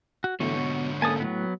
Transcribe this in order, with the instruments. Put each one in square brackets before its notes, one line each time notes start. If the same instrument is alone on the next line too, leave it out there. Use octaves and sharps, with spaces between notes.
[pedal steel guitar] F#4
[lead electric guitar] G#2 D3 [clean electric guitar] B2 E3 A3 [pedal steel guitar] C#5
[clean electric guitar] B2
[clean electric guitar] A#3 C#4 A4 [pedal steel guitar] G#5 A5 D#6
[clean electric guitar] A2 [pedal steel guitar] F#3 B3